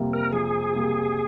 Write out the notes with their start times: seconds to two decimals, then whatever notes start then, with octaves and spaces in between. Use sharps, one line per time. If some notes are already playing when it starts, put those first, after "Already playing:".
Already playing: F2 C3 G3 A#3
0.13 A#4
0.32 F2 G#4
0.72 C3 G3 A#3